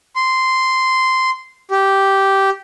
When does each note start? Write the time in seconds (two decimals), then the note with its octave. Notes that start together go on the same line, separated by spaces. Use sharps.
0.16 C6
1.71 G4